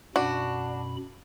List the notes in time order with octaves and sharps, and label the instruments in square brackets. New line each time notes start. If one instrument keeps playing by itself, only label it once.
[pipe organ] F#2 B2 B5 [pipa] D4 [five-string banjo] F#4